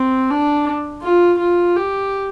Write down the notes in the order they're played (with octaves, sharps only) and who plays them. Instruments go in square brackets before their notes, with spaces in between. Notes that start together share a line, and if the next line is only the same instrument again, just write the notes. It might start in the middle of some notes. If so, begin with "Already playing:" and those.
Already playing: [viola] C4
D4
F4
F4
G4